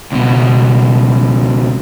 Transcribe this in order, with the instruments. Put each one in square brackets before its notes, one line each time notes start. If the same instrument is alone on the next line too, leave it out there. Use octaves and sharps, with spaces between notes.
[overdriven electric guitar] C#2 B2